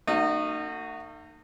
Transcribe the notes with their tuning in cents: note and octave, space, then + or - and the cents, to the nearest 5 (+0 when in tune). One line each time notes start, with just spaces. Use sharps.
A3 +45 D#4 -25 F#4 +0